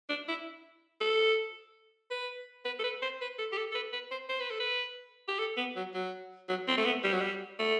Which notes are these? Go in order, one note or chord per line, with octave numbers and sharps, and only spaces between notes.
D4
E4
A4
B4
B4
A4
B4
C5
B4
A4
G4
A4
A4
B4
B4
C5
C5
B4
A4
B4
G4
A4
B3
F#3
F#3
F#3
C4
A3
B3
G3
F#3
G3
A3